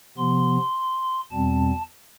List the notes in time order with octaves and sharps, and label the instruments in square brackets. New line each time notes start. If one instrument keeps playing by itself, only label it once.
[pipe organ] C3 F3 B3 C6
E2 B2 G3 C4 A5